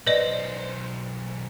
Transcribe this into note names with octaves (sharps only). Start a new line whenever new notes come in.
B1 B4 C5 D5 D#5